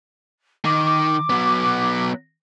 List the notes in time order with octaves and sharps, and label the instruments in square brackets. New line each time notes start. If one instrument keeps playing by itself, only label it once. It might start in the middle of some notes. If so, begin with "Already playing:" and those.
[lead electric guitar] D#3 [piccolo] D6
[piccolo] D6
[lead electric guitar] F#3 B3